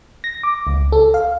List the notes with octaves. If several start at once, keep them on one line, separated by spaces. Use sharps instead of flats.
A#6
D6
C#2
A4
F5